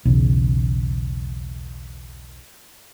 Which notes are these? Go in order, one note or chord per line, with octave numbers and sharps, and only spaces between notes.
B1 E2 C#3